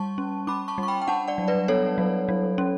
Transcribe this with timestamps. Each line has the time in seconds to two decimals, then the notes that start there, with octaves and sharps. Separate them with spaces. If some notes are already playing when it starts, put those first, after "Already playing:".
Already playing: G3 A5 C#6
0.18 C#4
0.47 C#4 B5 D6
0.68 A5 C#6
0.78 G3
0.83 C#6
0.88 G5 B5
1.02 G5
1.08 D4 F#5 A5
1.28 D5 F#5
1.38 F#3
1.48 B4 D5
1.68 B3 A4 C#5
1.98 F#3
2.29 F#3
2.58 C#4